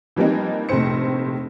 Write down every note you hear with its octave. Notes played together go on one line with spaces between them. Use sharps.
E3 F3 G3 A#3 C4 D#4
F1 A#1 A2 C3 C5 C#7